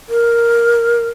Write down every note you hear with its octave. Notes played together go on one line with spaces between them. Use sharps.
A#4